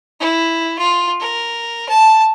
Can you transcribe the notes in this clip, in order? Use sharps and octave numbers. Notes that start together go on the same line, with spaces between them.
E4
F4
A#4
A5